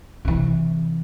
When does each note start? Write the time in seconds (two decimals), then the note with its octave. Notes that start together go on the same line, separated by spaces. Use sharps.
0.25 C3 E3